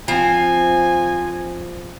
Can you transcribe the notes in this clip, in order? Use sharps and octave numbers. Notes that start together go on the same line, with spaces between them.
F3 C4 G#5